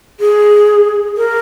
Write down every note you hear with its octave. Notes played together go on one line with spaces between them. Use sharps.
G#4
A#4